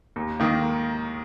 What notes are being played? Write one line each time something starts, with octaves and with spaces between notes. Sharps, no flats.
D#2
D#3 A#3